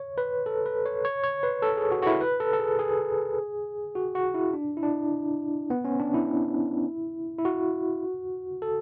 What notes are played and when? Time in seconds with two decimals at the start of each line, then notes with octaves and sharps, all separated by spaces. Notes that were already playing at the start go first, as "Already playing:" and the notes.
Already playing: C#5
0.18 B4
0.46 A4
0.66 B4
0.85 C#5
1.05 C#5
1.24 C#5
1.43 B4
1.62 A4
1.77 G#4
1.92 F#4
2.02 F#4
2.07 E4
2.21 B4
2.40 A4
2.53 A4
2.59 G#4
2.79 G#4
3.95 F#4
4.15 F#4
4.35 E4
4.54 D4
4.77 E4
4.83 D4
5.70 B3
5.85 C#4
6.00 D4
6.14 E4
7.39 E4
7.45 F#4
8.62 A4